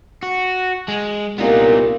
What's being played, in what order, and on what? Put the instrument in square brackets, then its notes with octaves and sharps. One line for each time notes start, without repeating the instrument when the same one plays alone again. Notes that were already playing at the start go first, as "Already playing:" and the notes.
[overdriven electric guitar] F#4
G#3
[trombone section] C2 A#2 [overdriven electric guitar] B3 D#4